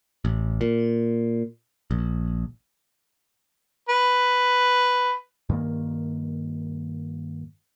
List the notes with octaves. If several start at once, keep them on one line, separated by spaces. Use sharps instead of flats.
A1
A#2
A#1
B4
G2 D#3 A#3